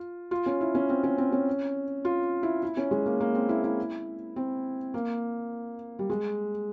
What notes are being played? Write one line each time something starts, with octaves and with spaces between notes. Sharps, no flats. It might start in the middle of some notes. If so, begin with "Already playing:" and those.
Already playing: F4
F4
C#4
E4
C#4
C4
C#4
C4
C#4
F4
E4
E4
C#4
G#3
A#3
A#3
C4
E4
E4
C4
A#3
G3
G#3